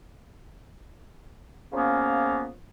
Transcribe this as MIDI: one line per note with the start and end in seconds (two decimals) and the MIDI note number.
1.73 2.50 46
1.73 2.50 49
1.73 2.50 53
1.73 2.50 58
1.73 2.50 59
1.73 2.50 61